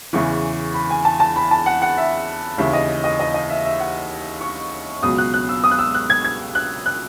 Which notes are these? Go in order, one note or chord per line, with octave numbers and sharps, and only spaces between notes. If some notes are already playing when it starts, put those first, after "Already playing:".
E2 C#3 E3 C#6
B5
G#5
A5
A5
B5
A5
F#5
F#5
E5
D#2 C#3 E3 E5
D#5
D#5
D#5
D#5
E5
E5
F#5
C#6
C#2 B2 F#3 D#6
F#6
F#6
E6
D#6
F#6
E6
F#6
G#6
G#6
F#6
F#6